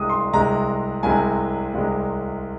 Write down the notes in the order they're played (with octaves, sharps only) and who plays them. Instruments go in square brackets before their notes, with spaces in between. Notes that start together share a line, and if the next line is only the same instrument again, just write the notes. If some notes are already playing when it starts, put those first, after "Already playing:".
Already playing: [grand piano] C2 C3 G#3 D#6
C6
C2 C3 G#3 A#5
C2 C3 G#3 G#5
C2 C3 G#3